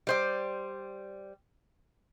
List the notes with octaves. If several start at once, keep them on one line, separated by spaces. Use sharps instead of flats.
G3 C5 D5